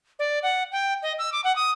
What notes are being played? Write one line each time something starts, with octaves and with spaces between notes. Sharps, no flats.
D5
F#5
G5
D#5
E6
D6
F#5
D#6